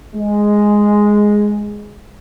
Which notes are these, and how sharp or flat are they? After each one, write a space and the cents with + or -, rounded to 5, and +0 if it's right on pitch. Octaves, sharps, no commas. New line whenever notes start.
G#3 +0